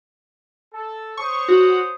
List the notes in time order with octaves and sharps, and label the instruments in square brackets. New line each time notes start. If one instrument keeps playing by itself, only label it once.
[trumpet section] A4
[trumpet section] C5 C#5 D#6 [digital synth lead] C#6
[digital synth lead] F#4